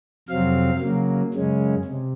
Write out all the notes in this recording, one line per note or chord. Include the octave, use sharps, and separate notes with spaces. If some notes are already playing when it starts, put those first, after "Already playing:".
F2 C3 F#3 C4 F5
C#3 F#3 A#3
F#2 C#3 G#3 C#4
C3